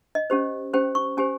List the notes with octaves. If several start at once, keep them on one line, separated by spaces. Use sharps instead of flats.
D#5
C#4 G4 C5
C#4 G4 C5 G5
C#6
C#4 G4 C5 G#5